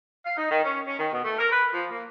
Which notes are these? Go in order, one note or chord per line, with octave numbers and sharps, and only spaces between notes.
F5
D#4
D#3
C#4
C#4
D#3
B2
A3
A#4
B4
F3
A#3